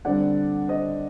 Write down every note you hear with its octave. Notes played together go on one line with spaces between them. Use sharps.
D3 G3 C4 D5 F#5
C5 D#5